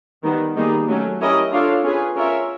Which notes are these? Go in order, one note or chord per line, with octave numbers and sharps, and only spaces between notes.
D#3 G3 B3
D#3 G3 A#3 D#4 G#4
F#3 A3 C#4
C#4 E4 G4 A#4 D#5
D4 F4 A4 C#5 F5
C#4 F4 G#4 B4
C#4 F4 A#4 C#5 E5